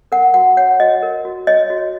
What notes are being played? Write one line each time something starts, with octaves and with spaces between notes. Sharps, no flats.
A#4 F#5
F#4 F#5
C#5 F#5
F#4 D#5
A#4
F#4
C#5 D#5
F#4